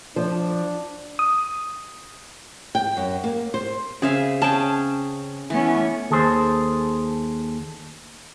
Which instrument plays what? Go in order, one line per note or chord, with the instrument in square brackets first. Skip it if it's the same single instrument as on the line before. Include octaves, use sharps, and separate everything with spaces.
[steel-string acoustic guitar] F3 [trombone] D4
[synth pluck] D#6
[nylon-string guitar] G5
F#2
A#3
C5
[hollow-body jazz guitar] C#3 C4 [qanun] G#4 E5 F5
[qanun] C#4 G#4 G5 [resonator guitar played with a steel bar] A5
[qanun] E3 [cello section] A3 B3 C#4
[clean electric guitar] D#2 G#4 A4 C5